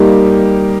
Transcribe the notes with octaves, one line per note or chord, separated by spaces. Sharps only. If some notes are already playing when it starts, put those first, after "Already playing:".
Already playing: G3 A#3 D#4 G4